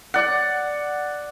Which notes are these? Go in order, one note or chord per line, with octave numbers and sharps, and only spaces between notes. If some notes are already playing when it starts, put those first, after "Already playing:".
D5 F#5